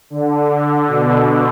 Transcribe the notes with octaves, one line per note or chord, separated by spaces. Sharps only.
D3
D3
B2